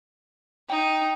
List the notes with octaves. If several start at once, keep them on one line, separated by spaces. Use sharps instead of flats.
D#4 G5